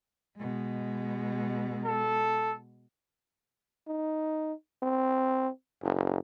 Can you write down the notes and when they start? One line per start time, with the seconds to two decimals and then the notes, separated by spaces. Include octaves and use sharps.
0.36 B2 G#3
1.85 A4
3.87 D#4
4.82 C4
5.82 F#1